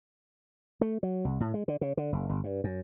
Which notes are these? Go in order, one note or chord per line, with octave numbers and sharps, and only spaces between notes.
A3
F#3
C2
A2
G#3
D3
C#3
D3
F#1
G1
G2
F#2